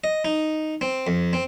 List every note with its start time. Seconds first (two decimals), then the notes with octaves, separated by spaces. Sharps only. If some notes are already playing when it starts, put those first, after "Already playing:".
0.04 D#5
0.25 D#4
0.81 C4
1.07 F2
1.33 C4